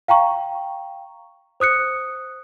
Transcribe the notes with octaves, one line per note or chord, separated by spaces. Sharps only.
F5 G5 A#5 C#6
C5 D#6 F#6 C#7